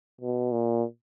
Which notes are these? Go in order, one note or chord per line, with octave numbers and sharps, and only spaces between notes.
B2
A#2